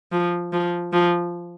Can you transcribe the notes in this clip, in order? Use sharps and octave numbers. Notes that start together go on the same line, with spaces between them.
F3
F3
F3